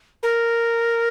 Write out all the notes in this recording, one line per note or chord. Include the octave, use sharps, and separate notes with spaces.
A#4